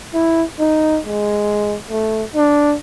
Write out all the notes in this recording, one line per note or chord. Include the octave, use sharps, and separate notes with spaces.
E4
D#4
G#3
A3
D4